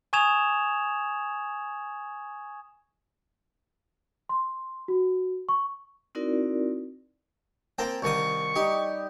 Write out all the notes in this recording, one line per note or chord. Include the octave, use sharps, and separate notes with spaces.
G#5 C#6 D#6 G#6 E7 F7
C6
F#4
C#6
C4 D#4 E4 F#4 A#4 D5
A#3 C4 G5 A5 A#5
C2 D#3 C#6 D#6
G3 D#4 G4